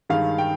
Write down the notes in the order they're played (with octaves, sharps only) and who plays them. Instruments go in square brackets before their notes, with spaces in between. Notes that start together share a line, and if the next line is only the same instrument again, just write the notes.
[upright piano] G2 D#3 G#3 F5
G5